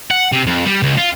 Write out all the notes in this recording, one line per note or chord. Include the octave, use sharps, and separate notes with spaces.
F#5
C3
F2
G3
C#2
F4